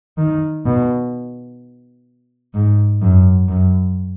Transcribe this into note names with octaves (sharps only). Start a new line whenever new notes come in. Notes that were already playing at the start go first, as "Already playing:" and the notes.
D#3
B2
G#2
F#2
F#2